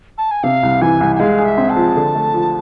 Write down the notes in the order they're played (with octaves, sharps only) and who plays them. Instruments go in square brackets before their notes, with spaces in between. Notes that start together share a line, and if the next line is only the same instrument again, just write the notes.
[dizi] A5
G#5
[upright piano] C3 [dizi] F5
[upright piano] C2
[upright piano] E3 [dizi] G#5
[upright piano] C2
[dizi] G#5
[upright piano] G#3 [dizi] F5
[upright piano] G#4
[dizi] E5
[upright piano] C4
[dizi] A5
[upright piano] F3
D3
A3
F3